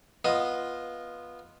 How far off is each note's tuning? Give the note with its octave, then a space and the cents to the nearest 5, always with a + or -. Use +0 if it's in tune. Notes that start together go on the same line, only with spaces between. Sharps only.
B3 -10 F4 +0 D#5 +0